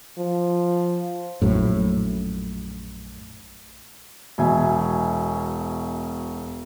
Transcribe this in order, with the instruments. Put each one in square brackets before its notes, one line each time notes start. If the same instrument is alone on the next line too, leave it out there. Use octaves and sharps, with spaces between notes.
[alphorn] F3
[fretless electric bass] A#1 F#2 A2
[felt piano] E1 B2 E5 G#5